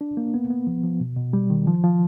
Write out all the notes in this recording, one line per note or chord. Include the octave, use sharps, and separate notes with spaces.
D4
A#3
B3
B3
F3
F3
B2
B2
G3
D#3
F3
F3